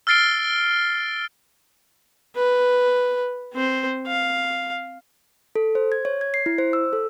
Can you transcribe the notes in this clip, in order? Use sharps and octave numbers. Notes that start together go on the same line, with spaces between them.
E6 F6 A6 C7 D7 G7
B4
C4 C5
F5
A4
C5
G#6
C#5
G#6
C7
E4
C5
E6
A4